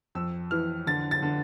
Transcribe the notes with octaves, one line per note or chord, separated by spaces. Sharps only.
F2 E6
E3 F6
D3 A6
A6
D3